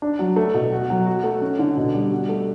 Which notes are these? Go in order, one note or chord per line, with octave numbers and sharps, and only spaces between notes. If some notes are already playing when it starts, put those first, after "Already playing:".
D4
F#3
A3
B2
F#4
F#3
F#4
A3
C#4
D3
B2
G3
F#4
A3